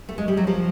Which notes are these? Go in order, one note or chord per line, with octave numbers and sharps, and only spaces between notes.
A3
G#3
G3
F#3
F3